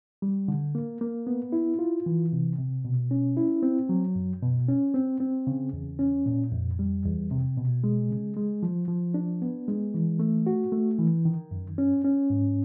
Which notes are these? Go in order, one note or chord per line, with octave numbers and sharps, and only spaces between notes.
G3
D3
A#3
A#3
B3
E4
F4
E3
C3
C3
B2
C#4
E4
C4
F#3
F#2
B2
C#4
C4
C4
C#3
E2
C#4
A#2
F2
G3
E2
C3
B2
G#3
C#3
G#3
F3
F3
D4
B3
G#3
E3
A3
F#4
A3
E3
D#3
F#2
C#4
C#4
G#2